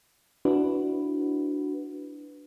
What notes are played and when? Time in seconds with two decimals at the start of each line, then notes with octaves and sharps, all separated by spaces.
0.45 D4 E4 F#4 B4